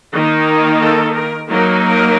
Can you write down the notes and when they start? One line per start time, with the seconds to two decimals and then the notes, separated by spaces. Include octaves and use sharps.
0.14 D#3 A#3 D#4
0.82 A4
1.16 A#4
1.50 F#3 A#3 D#4 A#4
1.85 A#4